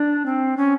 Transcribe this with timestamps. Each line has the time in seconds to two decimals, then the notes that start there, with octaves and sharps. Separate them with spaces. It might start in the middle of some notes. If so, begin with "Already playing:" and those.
Already playing: D4
0.26 C4
0.57 C#4